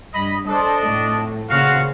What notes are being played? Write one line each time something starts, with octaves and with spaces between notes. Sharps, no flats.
G2 D#5 B5
D4 A4 C5 D#5
F2 A2 A3
A#2 C#3 F#4 C5 F5